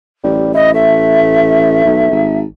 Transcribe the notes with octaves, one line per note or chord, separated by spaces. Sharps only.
A1 G3
E4 D#5
A3 E5
B1
G#1